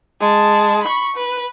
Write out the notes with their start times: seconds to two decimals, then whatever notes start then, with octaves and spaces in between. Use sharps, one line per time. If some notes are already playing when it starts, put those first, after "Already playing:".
0.20 G#3 A5
0.83 B5 C#6
1.16 B4